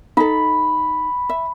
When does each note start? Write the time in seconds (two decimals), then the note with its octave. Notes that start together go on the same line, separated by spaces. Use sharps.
0.17 D#4 A4 B5
1.29 E5